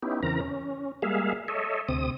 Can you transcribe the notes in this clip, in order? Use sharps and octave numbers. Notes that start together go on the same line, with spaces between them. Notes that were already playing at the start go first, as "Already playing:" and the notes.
B3 C#4 D#4 E4 G4
E2 C#3 E3 C4 A#4 A#5
C#4
G3 G#3 A#3 G#4 E5 F5
A4 C#5 D#5 E5
D2 C3 C4 D#6